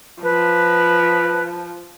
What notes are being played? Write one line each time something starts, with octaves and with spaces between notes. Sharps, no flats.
F3 B4